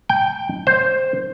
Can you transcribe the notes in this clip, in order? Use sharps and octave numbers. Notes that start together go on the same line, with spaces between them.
G5
C5